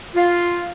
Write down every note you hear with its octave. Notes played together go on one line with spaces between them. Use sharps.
F4